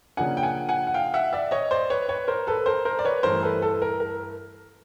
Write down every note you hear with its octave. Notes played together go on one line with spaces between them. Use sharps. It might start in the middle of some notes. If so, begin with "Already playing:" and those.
C#3 F3 A#3 D4 F#5 G#5
G5
F#5 G#5
F#5 G#5
F#5
F5 G5
E5 F#5
D5 E5
C#5 D#5
C5 D5
B4 C#5
B4 C#5
A#4 C5
A4 B4
A#4 C5
A#4 C5
D5
B4 C#5
G2 E3 A3 A#4 C5
A4 B4
A4
B4
A#4
A#4